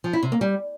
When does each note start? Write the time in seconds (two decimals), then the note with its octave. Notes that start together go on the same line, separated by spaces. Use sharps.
0.04 F3
0.13 E4
0.23 C3
0.32 A#3
0.41 G3